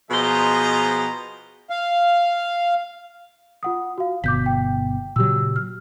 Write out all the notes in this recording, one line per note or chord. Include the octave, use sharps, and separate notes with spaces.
B2 F3 G#4 C5 D#5 A#5
F5
F4 F#5 D#6
F#4 F5
G1 B2 D6 G6 B6
G5
A#2 C#3 F#3 G4 E6
F6